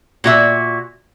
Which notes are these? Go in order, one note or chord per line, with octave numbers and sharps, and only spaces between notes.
A#2 F#4 E5